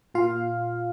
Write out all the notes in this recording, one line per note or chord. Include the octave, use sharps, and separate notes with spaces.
A#2 F4 F5